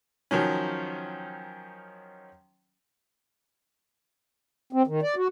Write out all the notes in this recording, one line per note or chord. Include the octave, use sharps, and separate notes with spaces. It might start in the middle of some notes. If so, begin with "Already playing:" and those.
D#3 F3 F#3 C#4
C4
D#3
D5
F#4